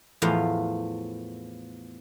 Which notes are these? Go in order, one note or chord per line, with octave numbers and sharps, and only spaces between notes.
E2 A2 F3 F5